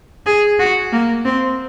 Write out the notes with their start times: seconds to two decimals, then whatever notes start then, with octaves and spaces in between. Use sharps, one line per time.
0.26 G#4
0.59 F#4
0.93 A#3
1.25 C4